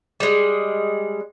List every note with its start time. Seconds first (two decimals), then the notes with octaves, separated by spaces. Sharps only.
0.20 G3 G#3